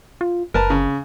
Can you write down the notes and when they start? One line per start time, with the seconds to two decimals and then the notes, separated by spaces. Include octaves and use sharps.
0.21 F4
0.54 F#1 A#4 B4 A5
0.70 C#3